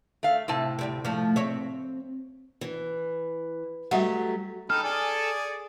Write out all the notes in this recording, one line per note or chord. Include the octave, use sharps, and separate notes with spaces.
A3 F5
A2 C3 A5
D2 G3 C4
F3 A3
C4 C#5 E5
E3
F#3 G3 A3 G4 E5 F#5
D#4 A4 G5 B5 F6
G#4 D5 G#5